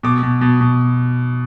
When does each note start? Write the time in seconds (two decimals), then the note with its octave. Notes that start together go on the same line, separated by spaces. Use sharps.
0.03 B2 D6
0.23 B2
0.41 B2
0.61 B2